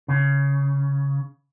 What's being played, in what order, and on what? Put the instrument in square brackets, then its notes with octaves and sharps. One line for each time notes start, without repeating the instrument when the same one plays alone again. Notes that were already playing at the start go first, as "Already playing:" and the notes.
[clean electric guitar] C#3